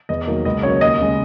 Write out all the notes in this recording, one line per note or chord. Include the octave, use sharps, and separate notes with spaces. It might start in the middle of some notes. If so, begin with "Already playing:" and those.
E2 D#5
D#3 F#3 A#3
C#2 D#5
C#3 F#3 A#3 C#5
D#2 D#5
C#3 G#3